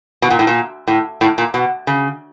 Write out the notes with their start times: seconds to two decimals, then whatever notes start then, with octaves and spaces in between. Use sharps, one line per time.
0.22 B2
0.30 A#2
0.39 A2
0.47 A#2
0.87 A2
1.21 A2
1.38 A#2
1.54 B2
1.87 C#3